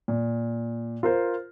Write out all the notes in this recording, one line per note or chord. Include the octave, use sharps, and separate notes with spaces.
A#2
F4 A#4 C5